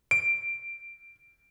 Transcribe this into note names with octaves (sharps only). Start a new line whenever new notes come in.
D7